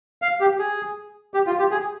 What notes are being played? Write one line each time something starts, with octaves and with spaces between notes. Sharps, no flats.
F5
G4
G#4
G4
F4
G4
G#4